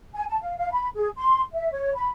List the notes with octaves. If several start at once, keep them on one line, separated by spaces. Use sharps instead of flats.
G#5
A5
F5
F5
B5
G#4
C6
E5
C#5
B5